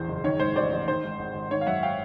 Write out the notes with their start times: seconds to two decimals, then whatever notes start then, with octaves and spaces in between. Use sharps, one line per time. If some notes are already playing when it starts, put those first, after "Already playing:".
Already playing: A#1 E2 E3 C5
0.08 F#1
0.24 D#3 C#5
0.40 G#2 C5
0.56 A1 C5 D5
0.72 A1
0.88 D#3 C5
1.04 G#2
1.19 G#1
1.35 G#1
1.51 D#3 C#5
1.61 F5
1.67 F#2 E5 F#5
1.83 F5 G5